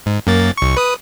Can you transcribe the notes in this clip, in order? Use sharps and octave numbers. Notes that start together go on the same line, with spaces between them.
G#2
F#2 A#3 A6
C2 C#6
B4 D#6